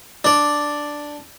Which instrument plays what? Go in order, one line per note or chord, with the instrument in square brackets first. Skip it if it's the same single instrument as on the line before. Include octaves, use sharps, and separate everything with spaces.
[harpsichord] D4 D5